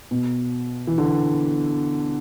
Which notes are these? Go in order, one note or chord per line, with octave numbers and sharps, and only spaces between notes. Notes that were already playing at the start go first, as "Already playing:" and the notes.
B2
E3
D3